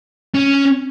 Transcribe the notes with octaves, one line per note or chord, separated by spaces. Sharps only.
C#4